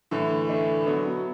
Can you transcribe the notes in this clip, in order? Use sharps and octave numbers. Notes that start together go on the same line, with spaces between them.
A2 D3 E3
A3 D4
D3 F#3 B3
B2